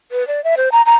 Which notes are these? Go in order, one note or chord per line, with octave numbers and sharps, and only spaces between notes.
B4
D5
E5
C5
A#5
A#5